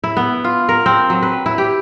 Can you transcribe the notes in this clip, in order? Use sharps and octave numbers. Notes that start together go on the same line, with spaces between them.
E4
B3
F4
A#4
C4
F#3
B4
E4
G4